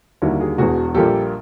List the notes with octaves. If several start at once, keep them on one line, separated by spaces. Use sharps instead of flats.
D#2 D3 G3 A#3 E4 F#4
F#4 G#4
E1 E2 B2 F#4 G#4
A#1 A#2 G3 A#3 G4 A4